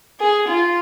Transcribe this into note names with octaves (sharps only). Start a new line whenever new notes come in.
G#4
F4